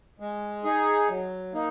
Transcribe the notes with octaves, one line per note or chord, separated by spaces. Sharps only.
G#3
D#4 G#4
F#3
A#3 D#4